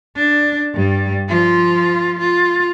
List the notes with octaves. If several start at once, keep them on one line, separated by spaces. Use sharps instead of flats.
D4
G2 G3
F3 F4
F4